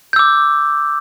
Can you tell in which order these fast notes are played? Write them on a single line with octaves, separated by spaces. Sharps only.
G6 E6 D6